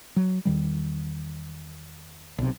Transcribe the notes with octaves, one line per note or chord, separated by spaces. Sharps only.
F#3
E2 D#3 G3
B1 C3